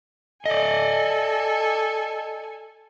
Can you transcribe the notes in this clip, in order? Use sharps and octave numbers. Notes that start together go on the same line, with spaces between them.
A4 D5 D#5 G#5